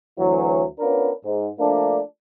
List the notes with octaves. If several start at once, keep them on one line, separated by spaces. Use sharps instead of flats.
D2 E3 F#3
B3 C#4 D4 F4 A#4 B4
G#2
F3 A3 A#3 D4